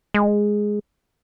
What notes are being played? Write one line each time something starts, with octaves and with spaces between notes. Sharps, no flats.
G#3